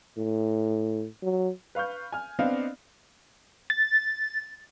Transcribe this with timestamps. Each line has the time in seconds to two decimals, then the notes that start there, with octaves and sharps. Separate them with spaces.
0.17 A2
1.22 F#3
1.75 B4 F5 C#6 F6 G6
2.12 G#5 F6
2.39 B3 C4 D4 D5 D#5 F5
3.70 A6